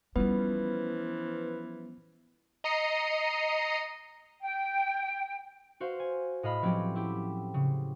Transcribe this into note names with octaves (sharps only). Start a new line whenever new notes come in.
E3 F3 G3 B3 C#4 B4
D#5 A#5 C7 C#7 D#7
G5
F#4 C5 F5
G#5
A2 D#5 F5 B5
F3 F#3 C4 C#4 G4
E4 G4
C#3